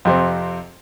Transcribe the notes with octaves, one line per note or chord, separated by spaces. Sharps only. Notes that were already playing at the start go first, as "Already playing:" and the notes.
F2 C3 C4